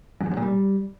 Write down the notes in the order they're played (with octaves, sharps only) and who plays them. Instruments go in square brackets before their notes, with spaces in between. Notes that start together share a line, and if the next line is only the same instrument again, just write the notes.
[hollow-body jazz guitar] F#2
E2
F#2
A#2
G3